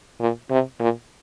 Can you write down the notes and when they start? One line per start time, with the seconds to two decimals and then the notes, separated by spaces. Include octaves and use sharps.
0.21 A#2
0.51 C3
0.81 A#2